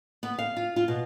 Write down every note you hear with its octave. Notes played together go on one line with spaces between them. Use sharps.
B3
F5
F4
F4
B2